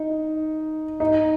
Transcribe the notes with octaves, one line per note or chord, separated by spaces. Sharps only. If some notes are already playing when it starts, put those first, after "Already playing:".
Already playing: D#4
D#4